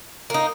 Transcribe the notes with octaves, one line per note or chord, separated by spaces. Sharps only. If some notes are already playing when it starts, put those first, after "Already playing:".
A#3 D#4